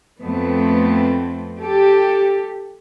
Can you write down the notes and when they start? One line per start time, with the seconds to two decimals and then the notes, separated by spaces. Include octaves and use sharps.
0.19 F2 A3 B3 C4
1.58 G4 A4